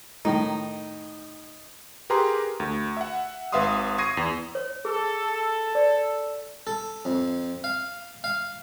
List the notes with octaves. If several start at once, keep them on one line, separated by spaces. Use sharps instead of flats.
A2 D#3 D#4
G4 G#4 A#4 B4 A#5 C6
D2
E5 F#5
G#1 B4 E5 F5 C6 D#6
C#6 D#6 G#6 A#6 C7 D#7
E2
C#5
G#4 A4
D5
A4
F2
F5
F5